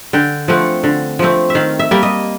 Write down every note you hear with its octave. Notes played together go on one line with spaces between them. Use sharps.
D3 G5
F3 A3 C4 F#5
D3
F3 A3 C4
E5
D#3 F5
E5
G3 A#3
D#5